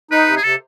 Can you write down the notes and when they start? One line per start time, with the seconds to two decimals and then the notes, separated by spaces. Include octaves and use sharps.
0.11 D#4 B4
0.27 C3
0.37 G#4
0.43 C3 A4